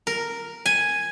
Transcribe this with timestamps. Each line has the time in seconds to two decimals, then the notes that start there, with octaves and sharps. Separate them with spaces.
0.07 A#4
0.66 G#5